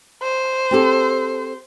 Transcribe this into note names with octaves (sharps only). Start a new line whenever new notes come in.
C5
C4 G4 A4